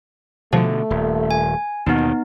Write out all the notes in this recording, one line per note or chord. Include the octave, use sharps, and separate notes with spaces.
B2 D3 F3 A3
D#1
G#5
D#2 B2 D#3 B3 D#4